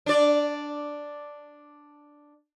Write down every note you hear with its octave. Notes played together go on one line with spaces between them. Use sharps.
D4 D5